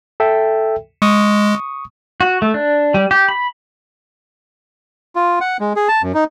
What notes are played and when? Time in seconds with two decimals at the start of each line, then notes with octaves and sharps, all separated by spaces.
0.20 A4 E5 G5
1.02 G#3 C#6 D#6
2.21 F#4
2.42 A3
2.54 D4
2.94 G3
3.11 G4
3.28 B5
5.16 F4
5.41 F#5
5.60 G#3
5.76 G#4
5.88 A5
6.03 F#2
6.14 D#4